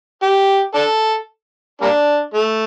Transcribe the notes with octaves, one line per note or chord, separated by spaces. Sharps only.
G4
D4 A4
G3 A#3 D4
A3